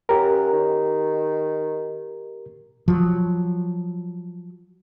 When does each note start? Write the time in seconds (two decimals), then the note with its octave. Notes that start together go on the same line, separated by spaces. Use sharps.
0.09 F#2 G4 A#4
0.53 D#3
2.88 F3 F#3